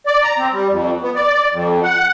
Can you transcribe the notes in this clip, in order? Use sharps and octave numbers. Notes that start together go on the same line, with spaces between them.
D5
A#5
C4
G3
F2
B3
D5
D5
F2
F#5